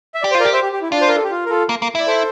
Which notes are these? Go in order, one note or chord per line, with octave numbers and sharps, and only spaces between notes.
E5
G4 D5
C5
F4
A#4 D5
G4
C5 E5
G4
G4
E4
D4 F4
C5
A#4
A4
G4
F4
A#4
F4 A4
A#3
A#3
E4 D5
A4 C5